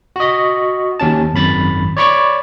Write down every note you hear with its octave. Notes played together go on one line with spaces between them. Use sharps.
F#4 D#5
D#2 C#4 A5
G#1 F#2 B5 A6
C#5 D5 B5 C#6 D6